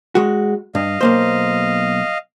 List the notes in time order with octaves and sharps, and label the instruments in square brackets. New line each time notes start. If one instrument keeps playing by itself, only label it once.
[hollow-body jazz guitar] G#3 F#4
[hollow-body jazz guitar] G2 [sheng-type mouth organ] D#5 F5
[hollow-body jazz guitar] B1 A#3 C5